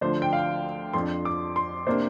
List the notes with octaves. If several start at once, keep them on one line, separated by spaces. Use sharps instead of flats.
D2 D3 F3 D4 C5
G5
F5
F2 F3 D4 C6
D6
C6
C3 A#3 D4 C5